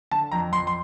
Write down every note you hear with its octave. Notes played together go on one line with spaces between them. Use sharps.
D3 A5
F2 A#5
F2 C6
C6